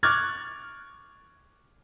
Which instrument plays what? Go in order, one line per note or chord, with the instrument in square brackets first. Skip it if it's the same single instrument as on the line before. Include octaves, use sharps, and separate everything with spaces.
[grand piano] C#6 D6 F6 F#6 G#6 A6